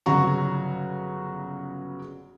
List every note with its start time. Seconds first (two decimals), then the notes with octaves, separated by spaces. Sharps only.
0.06 G1 C#3 F#3 F#4 A#5 C#6